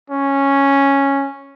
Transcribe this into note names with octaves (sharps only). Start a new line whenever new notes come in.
C#4